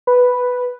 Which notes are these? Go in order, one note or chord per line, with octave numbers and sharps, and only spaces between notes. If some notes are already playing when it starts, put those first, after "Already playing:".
B4